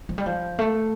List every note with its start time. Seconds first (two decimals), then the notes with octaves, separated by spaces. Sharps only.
0.09 F3
0.18 G3
0.26 F3
0.59 A3